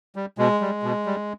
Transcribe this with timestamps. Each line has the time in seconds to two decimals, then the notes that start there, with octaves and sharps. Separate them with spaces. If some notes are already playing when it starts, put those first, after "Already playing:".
0.16 G3
0.38 B2 G#3
0.61 G3
0.83 B2
1.06 G3